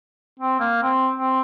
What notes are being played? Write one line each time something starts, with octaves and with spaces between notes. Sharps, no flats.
C4
A#3
C4
C4